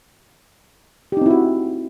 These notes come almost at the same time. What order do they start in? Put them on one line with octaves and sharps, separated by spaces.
G4 D#4 C4 E4 F#4